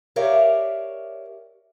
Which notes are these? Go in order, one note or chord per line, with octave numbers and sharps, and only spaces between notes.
G4 A#4 C#5 D5 E5 F5